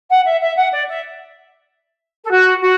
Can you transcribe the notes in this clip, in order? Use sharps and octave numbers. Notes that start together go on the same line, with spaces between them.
F#5
E5
E5
F#5
D5
E5
A4
F#4
F#4